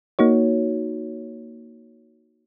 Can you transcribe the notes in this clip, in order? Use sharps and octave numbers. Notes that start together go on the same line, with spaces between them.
A#3 D#4 F#4 C#5